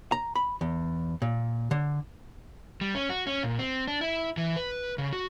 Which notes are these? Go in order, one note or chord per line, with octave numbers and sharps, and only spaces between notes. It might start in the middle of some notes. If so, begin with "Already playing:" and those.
A#5
B5
E2
A#2
D3
G3
C#4
F#4
C#4
A#2
C4
D4
E4
E3
B4
C#3
F#4